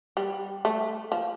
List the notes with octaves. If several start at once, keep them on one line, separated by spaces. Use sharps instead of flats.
G3
A3
F3